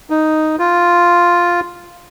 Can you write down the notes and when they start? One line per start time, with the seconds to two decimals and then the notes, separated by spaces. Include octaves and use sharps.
0.10 D#4
0.59 F4